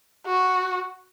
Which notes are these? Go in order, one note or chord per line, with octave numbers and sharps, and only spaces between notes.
F#4